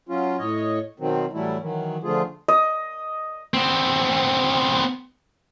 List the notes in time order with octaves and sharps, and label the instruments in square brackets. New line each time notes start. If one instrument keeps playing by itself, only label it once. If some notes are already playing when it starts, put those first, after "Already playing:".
[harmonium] F#3 C#4 F4
A2 C#5 D#5
B2 D#3 F#3 C4
A2 E3 F#3 G3 A3 E4
D#3 E3 F#3
D3 F3 A3 F4 G#4
[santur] D#5
[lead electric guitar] B3 C4